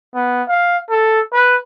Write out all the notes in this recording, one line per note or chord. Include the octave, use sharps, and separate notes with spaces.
B3
F5
A4
B4